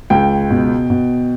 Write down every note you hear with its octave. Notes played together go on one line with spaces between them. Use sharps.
C#2 G5
B2
B2